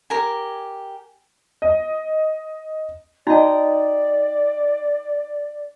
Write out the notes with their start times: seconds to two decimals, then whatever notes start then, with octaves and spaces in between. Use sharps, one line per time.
0.10 G4 A#4 G#5
1.62 D#5
3.27 D#4 F#4 D5 D#5 G5 A#5